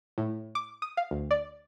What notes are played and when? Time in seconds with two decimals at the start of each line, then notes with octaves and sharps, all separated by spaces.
0.18 A2
0.55 D6
0.82 D#6
0.97 F5
1.11 D2
1.31 D5